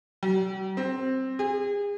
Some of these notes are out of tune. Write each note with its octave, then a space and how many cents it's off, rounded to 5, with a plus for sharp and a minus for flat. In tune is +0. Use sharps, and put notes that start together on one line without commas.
G3 -45
C4 +5
G#4 -35